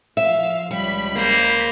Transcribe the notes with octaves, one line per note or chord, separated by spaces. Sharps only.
F3 E5 F5
C#2 G3 B5
A#3 C5